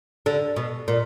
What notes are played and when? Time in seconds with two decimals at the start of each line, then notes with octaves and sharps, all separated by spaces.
0.26 D3
0.56 B2
0.88 A#2